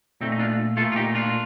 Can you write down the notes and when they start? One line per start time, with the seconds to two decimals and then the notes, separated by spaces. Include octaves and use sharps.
0.21 A#2 A3 C4 D#4
0.32 D#4
0.39 D4 F4
0.77 A3 F4 A4
0.82 A#2
0.92 F4
0.96 D#4 G4
1.14 D4 F4